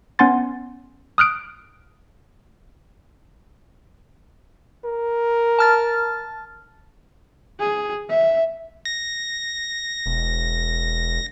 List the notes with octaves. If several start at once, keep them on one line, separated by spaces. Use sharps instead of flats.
B3 C#4 F#5 G#5 C6 A6
D#6 F6 F#6 D7
A#4
A5 F6 A6
G#4
E5
A#6
E1